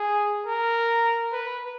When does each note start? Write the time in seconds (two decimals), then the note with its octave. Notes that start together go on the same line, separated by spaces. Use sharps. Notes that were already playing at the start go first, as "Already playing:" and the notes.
Already playing: G#4
0.46 A#4
1.32 B4